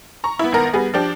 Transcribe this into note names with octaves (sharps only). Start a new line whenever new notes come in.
A#5 C#6
B3 E4
G#1 B3 A#4 A#5 A#6
G3 B3 G#4
F3 D4 G4